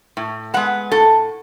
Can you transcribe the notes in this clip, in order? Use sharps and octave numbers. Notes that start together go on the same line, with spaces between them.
A2
G#3 B3 F#5
A2 A4